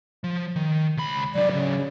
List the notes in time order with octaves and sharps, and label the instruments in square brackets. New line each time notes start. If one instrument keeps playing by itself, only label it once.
[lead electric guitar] F3
D#3
C#2 B5
[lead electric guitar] F#3 D4 [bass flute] D5
[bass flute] C#3